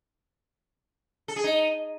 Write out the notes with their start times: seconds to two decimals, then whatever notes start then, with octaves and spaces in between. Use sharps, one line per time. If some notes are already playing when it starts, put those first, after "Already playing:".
1.28 A4
1.36 G#4
1.44 D#4